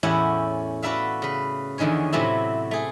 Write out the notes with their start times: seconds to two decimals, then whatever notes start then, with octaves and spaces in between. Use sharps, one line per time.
0.03 E2 A2 C#4 E4 G4 F#5
0.82 F#4 A4 B4 D5 E5 F5
1.22 C#3 B4
1.78 E2 D3 D#3 C#4 C#5
2.12 A2 C3 F#3 A3 C4 E4
2.71 A3 G#4